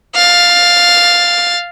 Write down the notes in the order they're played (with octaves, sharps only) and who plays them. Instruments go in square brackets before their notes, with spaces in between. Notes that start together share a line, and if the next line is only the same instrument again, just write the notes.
[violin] F5 A6